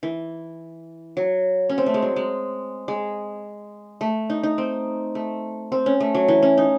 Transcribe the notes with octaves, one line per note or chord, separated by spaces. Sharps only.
E3
F#3
C#4
C4
A3
G#3
F#3
G#3
G#3
A3
D#4
D#4
C4
A3
C4
C#4
A3
F#3
E3
C#4
D#4